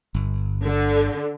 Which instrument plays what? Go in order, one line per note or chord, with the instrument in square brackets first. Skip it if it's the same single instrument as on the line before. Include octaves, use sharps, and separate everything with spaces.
[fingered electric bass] G1
[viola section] D3